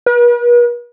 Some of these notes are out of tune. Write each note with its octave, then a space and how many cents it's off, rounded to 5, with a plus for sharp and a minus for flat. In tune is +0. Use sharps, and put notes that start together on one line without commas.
B4 -45